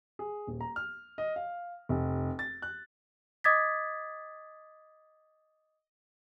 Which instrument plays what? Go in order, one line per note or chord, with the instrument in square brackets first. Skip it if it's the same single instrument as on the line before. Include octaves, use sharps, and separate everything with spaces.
[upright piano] G#4
D#1
A#5
F6
D#5
F5
F1
A6
F#6
[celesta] D#5 D6 D#6 G#6 A6 B6